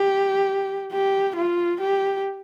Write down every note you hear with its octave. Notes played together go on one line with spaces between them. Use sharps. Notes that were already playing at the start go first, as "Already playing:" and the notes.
Already playing: G4
G4
F4
G4